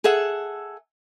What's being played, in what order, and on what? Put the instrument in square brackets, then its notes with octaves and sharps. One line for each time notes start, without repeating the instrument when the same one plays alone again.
[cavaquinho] G#4 A4 E5 F#5